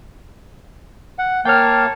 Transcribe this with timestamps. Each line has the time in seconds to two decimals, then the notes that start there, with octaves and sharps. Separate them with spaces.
1.19 F#5
1.45 A#3 C#5 F5 G5 A5 F6